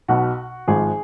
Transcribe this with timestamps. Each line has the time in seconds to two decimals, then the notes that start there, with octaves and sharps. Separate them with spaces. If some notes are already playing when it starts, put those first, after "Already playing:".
0.08 B1 B2 F#4
0.68 G#1 G#2 F3 G#4